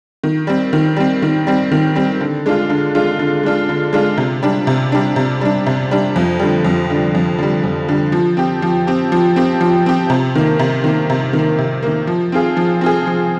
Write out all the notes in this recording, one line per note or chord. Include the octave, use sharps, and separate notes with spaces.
D#3
G3 C4
D#3
G3 C4
D#3
G3 C4
D#3
G3 C4
D3
G#3 D4 F4
D3
G#3 D4 F4
D3
G#3 D4 F4
D3
G#3 D4 F4
C3
G3 D4
C3
G3 D4
C3
G3 D4
C3
G3 D4
F2
D3 G3
F2
D3 G3
F2
D3 G3
F2
D3 G3
F3
C4 G4
F3
C4 G4
F3
C4 G4
F3
C4 G4
C3
D#3 A#3
C3
D#3 A#3
C3
D#3 A#3
C3
D#3 A#3
F3
C4 F4 G#4
F3
C4 F4 G#4
F3